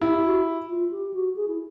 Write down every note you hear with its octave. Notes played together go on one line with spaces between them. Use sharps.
E4 G4
F#4
F4
G4
F#4
G#4
E4